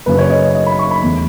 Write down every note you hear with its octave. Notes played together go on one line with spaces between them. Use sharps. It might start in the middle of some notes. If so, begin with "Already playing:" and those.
F#1 F#2 C#3 B4
C#5
D#5
D#5
D#5
B5
C#6
B5
E1 E2 B2 A3